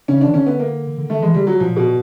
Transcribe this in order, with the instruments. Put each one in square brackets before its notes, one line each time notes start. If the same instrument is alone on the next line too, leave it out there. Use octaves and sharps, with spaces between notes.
[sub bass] C#3 [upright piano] C#4
[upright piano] D4
[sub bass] D#3
[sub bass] D3 [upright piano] C#4
[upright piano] B3
A#3
[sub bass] D3
[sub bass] D#3 [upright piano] A3
[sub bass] E3 [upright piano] G#3
[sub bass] D3 [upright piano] G3
[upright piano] F#3
[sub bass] A#2 [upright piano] F3
[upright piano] B2